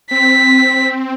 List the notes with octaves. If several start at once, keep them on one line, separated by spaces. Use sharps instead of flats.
C4 B6